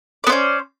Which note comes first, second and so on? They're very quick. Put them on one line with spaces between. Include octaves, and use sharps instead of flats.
D5 B3 C5 C#4